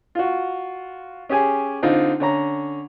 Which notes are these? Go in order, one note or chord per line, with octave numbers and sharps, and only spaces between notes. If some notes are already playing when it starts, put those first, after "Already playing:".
F4 F#4
C#4 G4 G#4 G#5
D3 C4 D#4 F4
D3 C#4 A#5